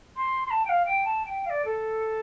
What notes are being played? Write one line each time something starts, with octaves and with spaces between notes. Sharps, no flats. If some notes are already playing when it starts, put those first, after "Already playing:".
C6
C6
A5
G5
F5
G5
A5
G5
F5
D5
A4